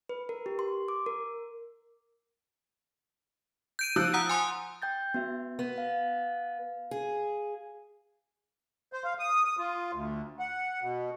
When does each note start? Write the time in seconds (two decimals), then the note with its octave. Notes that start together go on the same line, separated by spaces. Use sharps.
0.09 B4
0.29 A#4
0.46 G4
0.59 C6
0.88 D6
1.06 A#4
3.79 G6 D7 D#7
3.96 F3 E6 F#6
4.14 F#5 A#5 D#6
4.29 G#5 C6 D#6
4.82 G5 G6 A6
5.14 B3 F#4 E5
5.59 B3
5.78 F5
6.91 G#4
8.93 C5
9.04 F5
9.19 D#6
9.45 D#6
9.58 F4
9.93 D2
10.39 F#5
10.82 B2